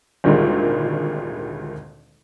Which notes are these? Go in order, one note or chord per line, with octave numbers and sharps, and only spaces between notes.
G#1 D2 A#2 D#3 G3 G#3